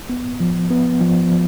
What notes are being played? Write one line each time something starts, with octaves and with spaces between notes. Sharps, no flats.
B3
F3
B3
F3
F3